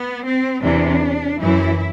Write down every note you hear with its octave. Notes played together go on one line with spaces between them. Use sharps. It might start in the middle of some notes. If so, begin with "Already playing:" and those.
Already playing: B3
C4
E2 C3 E3 D4
F#2 E3 E4